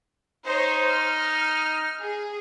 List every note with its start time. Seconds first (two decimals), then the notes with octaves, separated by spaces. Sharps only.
0.47 D#4 C5 C#5
0.90 F6
2.01 G#4